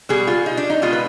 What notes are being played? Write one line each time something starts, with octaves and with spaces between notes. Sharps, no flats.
B2 G3 G#4
F4
D#4
D4
D#4
B2 G#3 F4
B4